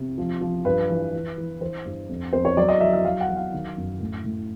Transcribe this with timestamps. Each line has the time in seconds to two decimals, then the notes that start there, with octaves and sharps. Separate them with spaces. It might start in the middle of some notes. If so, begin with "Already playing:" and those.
Already playing: C3
0.18 F3
0.41 F3
0.65 G2 B4
0.89 E3
1.13 E3
1.38 E3
1.61 E3 C5
1.86 G2
2.09 F2
2.33 F2 C5
2.45 C#5
2.57 F#3 D5
2.69 D#5
2.81 F#3 E5
2.93 E5
3.04 F#3 F5
3.21 F#5
3.29 F#3
3.36 F5
3.53 D#3
3.77 F#2
4.00 A2
4.24 A2